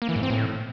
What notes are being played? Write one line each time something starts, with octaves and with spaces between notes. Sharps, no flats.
A#3
E3
G#2
C4
A2